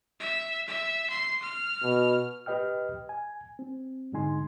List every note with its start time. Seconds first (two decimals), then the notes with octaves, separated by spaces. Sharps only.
0.20 E5
0.68 E5
1.10 C6
1.43 F6
1.83 B2
2.46 G4 B4 D#5 G5 F6
3.09 G#5
3.59 C4
4.12 G#2 D3 G#3 D#4 G#5 C6